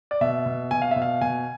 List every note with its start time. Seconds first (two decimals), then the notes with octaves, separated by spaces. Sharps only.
0.11 D5
0.21 B2 E5
0.46 B2
0.71 B2 G#5
0.82 F5
0.91 B2 E5
1.02 F5
1.21 B2 G#5